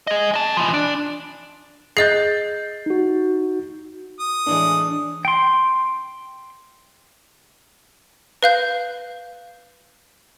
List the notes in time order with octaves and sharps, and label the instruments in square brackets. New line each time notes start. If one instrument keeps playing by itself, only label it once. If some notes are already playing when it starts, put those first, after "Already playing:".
[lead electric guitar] G#4 D#5
D#5 A5
E3 F3
D4
[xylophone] G#4 D#5 F#6 [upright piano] G6 A6 C7
[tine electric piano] D#4 F#4
[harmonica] D#6
[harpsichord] A2 E3 G#3 [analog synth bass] D4
[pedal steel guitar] G5 C6
[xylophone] B4 F5 G6